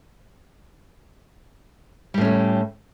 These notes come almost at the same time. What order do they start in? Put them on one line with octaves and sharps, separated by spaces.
G3 A2 C#4 A3